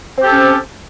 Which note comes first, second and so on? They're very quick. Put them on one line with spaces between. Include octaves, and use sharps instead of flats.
C4 G4 A4 C#4